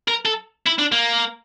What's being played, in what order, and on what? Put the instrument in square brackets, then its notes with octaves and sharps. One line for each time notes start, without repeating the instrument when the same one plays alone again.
[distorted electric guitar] A#4
A4
E4
D4
A#3